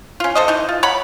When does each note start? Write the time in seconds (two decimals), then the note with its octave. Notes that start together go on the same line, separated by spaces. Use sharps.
0.20 C#4 F4
0.35 A4 C5 D#5
0.48 E3 D#4
0.69 F4
0.83 C#5 F#5 A#5 B5